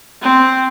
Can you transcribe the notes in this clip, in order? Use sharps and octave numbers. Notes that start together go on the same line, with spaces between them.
C4